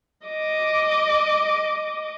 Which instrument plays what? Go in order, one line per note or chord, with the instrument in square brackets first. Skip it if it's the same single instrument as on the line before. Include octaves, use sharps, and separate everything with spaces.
[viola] D#5 D6